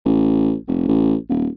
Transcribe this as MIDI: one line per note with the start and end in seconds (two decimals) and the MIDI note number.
0.05 0.54 33
0.67 0.84 29
0.87 1.15 33
1.29 1.47 27